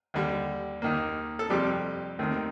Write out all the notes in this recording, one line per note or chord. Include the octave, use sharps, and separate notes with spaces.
D#2 D3 G3
D#2 D#3 A#3
A4
F2 C3 F3 G3 G4
D#2 D#3 A3 C4